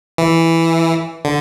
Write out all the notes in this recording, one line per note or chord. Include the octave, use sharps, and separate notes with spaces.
E3
D3